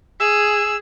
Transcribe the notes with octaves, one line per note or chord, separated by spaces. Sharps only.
G#4 E6